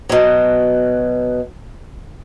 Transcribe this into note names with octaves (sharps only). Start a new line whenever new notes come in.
B2 F#3